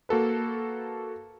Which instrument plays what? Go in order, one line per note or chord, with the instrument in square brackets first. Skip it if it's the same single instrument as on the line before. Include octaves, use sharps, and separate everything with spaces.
[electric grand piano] A#3 F#4 A4 B4